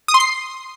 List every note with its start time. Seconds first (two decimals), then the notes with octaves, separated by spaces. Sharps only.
0.08 D#6
0.14 C6
0.20 C7